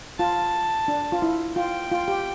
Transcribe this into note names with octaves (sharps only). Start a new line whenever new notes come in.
F4 A5
D4
F4
E4
F4 G5
F4
G4